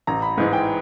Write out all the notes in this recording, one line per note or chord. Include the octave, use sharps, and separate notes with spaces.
A1 A#5
B5
G#2 E3 G#3
G5